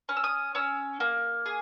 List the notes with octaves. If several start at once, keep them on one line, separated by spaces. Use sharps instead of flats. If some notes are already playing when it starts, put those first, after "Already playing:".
C#4
E6
D#6
C#4 E6
A#3
G#4